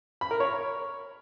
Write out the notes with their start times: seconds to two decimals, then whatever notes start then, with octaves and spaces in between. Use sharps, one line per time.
0.21 B5
0.31 A#4
0.40 C#5